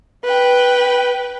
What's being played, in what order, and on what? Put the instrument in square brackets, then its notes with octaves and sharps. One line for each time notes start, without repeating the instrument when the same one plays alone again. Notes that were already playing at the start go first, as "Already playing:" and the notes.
[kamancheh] B4 G5